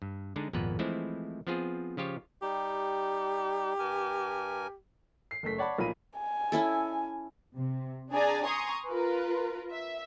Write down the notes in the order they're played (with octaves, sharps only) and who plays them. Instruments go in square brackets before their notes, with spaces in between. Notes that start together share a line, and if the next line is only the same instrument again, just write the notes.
[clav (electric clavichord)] G2
D3 G#3 D4 D#4
G#1 F2 A#2 A#3 B3 B4
E3 F3 G#3 A3 C4 E4
F3 B3 C4 F4 G#4
C#3 F3 F4 G4 C#5
[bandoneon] G3 D#4 [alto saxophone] G4
[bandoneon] G2 A#4 G#5
[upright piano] C7
F#1 A3 B6
C#5 D5 F#5 A5 B5
B1 A#2 F3 A#3 B5 D#7
[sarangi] G#5
[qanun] C#4 E4 A4
[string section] C3
D4 G#4 D5 G#5 A#5
G#5 A#5 C6 C#6 D#6
F4 A#4 B4
E5